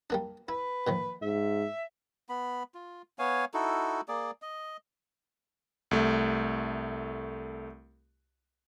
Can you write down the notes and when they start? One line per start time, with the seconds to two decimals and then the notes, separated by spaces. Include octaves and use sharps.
0.10 G3 A#3 D4
0.49 E4 B4
0.87 A#2 D#3 F3
1.22 G#2 E5
2.29 B3 B5
2.75 F4
3.19 B3 C#5 F5 G#5
3.54 D#4 E4 F#4 A4
4.08 A#3 G#4 D5
4.42 D#5
5.91 C2 A3